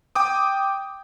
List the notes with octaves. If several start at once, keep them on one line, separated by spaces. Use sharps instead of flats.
G5 D6 D#6